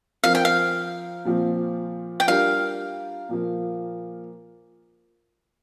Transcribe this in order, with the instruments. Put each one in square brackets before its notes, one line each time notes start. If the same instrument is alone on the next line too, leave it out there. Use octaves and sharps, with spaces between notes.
[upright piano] F3 C4 A#4 [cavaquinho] F5
[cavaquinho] G5
F5
[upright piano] A#2 F3 C4 F4
[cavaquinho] G5
[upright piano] G3 D4 F4 A#4 [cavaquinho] F5
[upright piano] A#2 F3 A#3